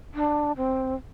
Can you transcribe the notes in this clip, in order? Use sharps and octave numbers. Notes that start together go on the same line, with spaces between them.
D4
C4